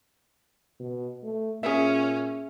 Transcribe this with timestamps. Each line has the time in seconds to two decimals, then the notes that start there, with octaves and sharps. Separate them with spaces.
0.80 B2
1.23 A3
1.63 A#2 C#4 G#4 E5